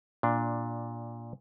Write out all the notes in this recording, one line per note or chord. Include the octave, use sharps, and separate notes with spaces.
A#2 D4